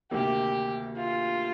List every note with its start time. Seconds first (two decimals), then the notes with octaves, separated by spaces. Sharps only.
0.11 D2 C3 D#3 A#3 G4
0.97 F4